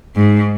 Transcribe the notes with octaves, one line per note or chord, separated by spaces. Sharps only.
G#2